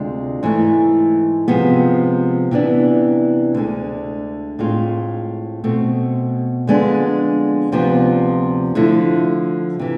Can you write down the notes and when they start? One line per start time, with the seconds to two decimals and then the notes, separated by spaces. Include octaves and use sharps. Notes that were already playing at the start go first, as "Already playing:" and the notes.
Already playing: D2 C3 G#3 D4 F4
0.43 G#2 E3 A3
1.48 C3 F3 G#3 B3
2.51 C3 E3 B3 D4
3.54 D2 D3 G#3
4.59 A2 G#3 C4 F4
5.64 B2 A3 C4
6.67 F2 D3 G#3 B3 D4
7.72 D2 C3 F3 B3 F4
8.75 D3 F3 A3 E4
9.79 C3 E3